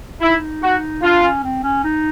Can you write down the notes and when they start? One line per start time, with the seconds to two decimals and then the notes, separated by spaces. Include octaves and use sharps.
0.21 D#4 E4
0.62 F#4
1.02 D4 F4
1.23 C#4
1.43 C4
1.64 C#4
1.84 D#4